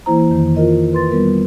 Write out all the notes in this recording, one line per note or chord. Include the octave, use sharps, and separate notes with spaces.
E3 A#3 E4 C5 A#5
F2 D#3
F4 A#4 D#5
B4 C6 A6
G3 B3 A#4